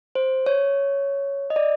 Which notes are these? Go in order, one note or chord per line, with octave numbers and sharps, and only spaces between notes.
C5
C#5
D#5
D5